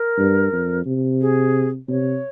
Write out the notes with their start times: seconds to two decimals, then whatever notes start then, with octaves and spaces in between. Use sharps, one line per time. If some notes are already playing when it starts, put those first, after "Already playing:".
Already playing: A#4
0.18 G2
0.53 F2
0.86 C3
1.21 G#4
1.88 C3 C#5